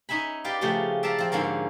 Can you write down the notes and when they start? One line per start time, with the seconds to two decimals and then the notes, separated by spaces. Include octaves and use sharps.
0.09 C#4 D#4 E5 G#5 B5
0.44 G4 B4 D5 F5
0.61 C#3 F3 A3 C#4 G4
1.03 D5 E5 F5 A5 A#5
1.19 F3 C4
1.32 G#2 D3 A#3 C#4